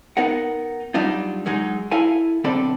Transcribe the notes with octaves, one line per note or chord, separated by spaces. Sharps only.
B3 D#4 A#4 F#5
F#3 G3 D4 D#4 F4
F#3 G#3 D#4 G#4
E4 A4 F5 G#5
B1 D3 C4 A4 D5 B5